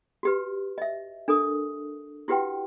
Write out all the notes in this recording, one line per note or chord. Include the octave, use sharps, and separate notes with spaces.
F#4 G4 B4
D#5 E5
D4 A4 A#4 D#6
E4 F#4 G4 B4 F#5 G5